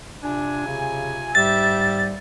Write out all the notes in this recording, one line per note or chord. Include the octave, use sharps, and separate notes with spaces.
C3 D4 F4 G#5
C#3
G#2 G3 G4 E5 A6